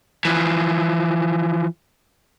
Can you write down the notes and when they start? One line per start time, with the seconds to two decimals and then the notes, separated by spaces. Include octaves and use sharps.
0.25 E3 F3